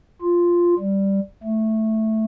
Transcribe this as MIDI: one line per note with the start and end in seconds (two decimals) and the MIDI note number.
0.22 0.74 65
0.79 1.20 55
1.43 2.25 57